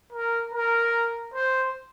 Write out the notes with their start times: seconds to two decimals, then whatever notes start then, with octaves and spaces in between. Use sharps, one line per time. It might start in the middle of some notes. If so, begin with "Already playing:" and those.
0.12 A#4
0.53 A#4
1.34 C5